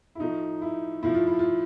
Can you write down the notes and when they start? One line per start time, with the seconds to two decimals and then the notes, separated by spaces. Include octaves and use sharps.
0.15 E4
0.20 A2 F3 A3 D#4
0.61 E4
1.03 A2 F3 A3 E4
1.14 F4
1.27 E4
1.39 F4